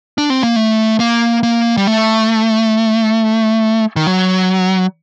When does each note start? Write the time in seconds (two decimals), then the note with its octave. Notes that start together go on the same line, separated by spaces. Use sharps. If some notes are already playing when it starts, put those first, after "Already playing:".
0.18 D4
0.30 C4
0.43 A#3
0.56 A3
1.00 A#3
1.43 A#3
1.77 G3
1.87 A3
3.96 D#3
4.07 F#3